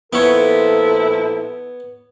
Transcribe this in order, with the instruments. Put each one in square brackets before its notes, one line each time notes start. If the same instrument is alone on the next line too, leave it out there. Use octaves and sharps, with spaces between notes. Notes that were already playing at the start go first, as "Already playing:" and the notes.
[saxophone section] A#2 F3 E4 [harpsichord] B3 C#5 [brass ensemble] A4